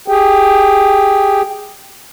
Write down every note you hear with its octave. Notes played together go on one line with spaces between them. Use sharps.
G4 G#4 G5